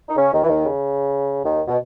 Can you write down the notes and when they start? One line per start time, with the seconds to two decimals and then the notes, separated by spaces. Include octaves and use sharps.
0.09 D#4
0.16 C#3 C#4
0.32 D#2 D#3
0.43 E3
0.49 D#2 D#3
0.65 C#3
1.45 D#2 D#3
1.68 B2